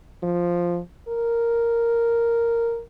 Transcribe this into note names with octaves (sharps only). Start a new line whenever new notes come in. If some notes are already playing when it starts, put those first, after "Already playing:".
F3
A#4